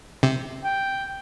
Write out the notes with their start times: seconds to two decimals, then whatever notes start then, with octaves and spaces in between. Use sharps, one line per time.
0.23 C3
0.64 G5